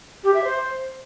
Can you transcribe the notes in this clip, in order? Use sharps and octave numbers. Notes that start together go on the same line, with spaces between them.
G4
E5
C5